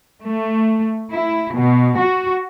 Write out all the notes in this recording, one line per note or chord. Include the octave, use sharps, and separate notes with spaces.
A3
E4
B2
F#4